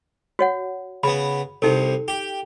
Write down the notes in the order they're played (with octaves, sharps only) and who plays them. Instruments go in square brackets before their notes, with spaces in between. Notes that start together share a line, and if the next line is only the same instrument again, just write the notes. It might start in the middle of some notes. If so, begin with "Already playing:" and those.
[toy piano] F#4 C#5 F#5
[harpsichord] C#3 B3 [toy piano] B5
[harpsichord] C2 C3 [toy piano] D#4 A4
[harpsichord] G4